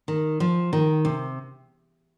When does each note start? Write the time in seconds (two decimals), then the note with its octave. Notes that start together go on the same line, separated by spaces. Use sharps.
0.08 D#3
0.40 F3
0.73 D#3
1.05 C3